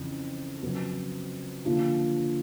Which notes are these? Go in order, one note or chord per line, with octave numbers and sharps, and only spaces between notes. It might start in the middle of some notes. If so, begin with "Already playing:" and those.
Already playing: F2 C#3 E3
F2 C#3 F#3 B3
D3 F3 A#3 D4 F4